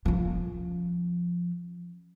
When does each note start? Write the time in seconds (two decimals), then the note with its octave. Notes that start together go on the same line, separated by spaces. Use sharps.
0.06 F3 C#4